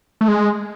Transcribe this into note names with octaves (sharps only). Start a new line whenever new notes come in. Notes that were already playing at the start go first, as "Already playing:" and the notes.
A3
G#3